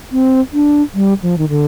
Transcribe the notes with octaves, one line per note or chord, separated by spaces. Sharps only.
C4
D4
G3
F3
D#3
D3